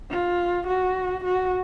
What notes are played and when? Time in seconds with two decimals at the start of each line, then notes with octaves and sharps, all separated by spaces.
0.10 F4
0.68 F#4
1.24 F#4